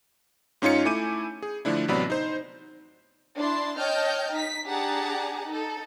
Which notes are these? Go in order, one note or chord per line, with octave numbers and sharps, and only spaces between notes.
G#2 C#4 D#4 F4 C#5 C#7
A3 E4 G#5 D6 G6 D#7
G#4
D3 F3 A3 D4 E4
A1 C3 F#3 B3 D5 B5
D#4 C5
D4 E4 A5 C6
C#5 D#5 G5 A5 F6 G6
D#4 B6
D4 G4 G#4 F#5 A5 A#5
D#4 A4